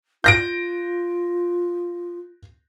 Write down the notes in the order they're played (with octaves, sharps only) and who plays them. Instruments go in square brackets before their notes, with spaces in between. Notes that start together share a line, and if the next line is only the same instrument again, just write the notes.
[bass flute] F4 [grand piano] G6 A#6 D7